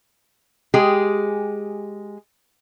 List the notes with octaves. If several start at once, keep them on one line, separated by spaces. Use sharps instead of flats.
G#3 G4 G#4